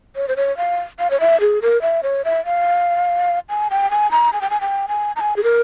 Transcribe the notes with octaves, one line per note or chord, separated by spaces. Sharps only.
C#5
C5
C#5
F5
F5
C#5
E5
G#4
A#4
E5
C#5
E5
F5
G#5
G5
G#5
A#5
G#5
G5
G#5
G5
G#5
A#5
G#5
G#4
A#4